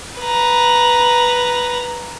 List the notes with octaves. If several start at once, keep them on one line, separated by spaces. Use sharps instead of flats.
B4 A#5